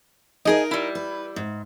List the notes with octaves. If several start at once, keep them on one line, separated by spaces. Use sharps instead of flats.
D#4 G#4 A#4 D#5
G3 E4
B4
G#2